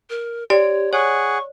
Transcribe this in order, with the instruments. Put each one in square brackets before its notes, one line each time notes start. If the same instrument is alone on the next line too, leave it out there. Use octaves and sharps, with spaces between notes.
[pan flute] A#4
[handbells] G4 [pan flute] C#5 [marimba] D5
[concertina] G#4 F#5 [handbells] C#5 [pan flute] C#6